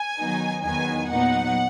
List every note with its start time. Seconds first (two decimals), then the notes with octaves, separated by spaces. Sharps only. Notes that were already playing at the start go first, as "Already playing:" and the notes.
Already playing: G#5
0.18 D#3 F#3 B3 D#4
0.63 E2 D#3 F#3 B3 D#4 G#5
1.10 A#2 F#3 B3 D#4 F#5